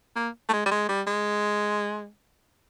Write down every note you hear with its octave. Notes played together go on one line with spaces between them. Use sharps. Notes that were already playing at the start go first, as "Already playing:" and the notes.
A#3
A3
G#3
G3
G#3
G3
G#3